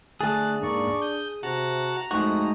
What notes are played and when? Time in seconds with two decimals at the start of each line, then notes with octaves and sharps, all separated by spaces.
0.21 D3 A3 G#4 A5 F#6
0.63 G#2 A#3 D4 D5 C#6
1.02 D#6 G6
1.43 C3 F#4 F#5 A5 A#5
2.11 F2 G#3 A3 D#4 F#4